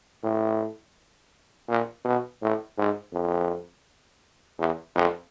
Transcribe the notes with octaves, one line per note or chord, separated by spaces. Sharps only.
A2
A#2
B2
A2
G#2
F2
E2
F2